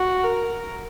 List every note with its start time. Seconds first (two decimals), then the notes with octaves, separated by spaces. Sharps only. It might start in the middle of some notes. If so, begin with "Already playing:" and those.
Already playing: F#4
0.24 A#4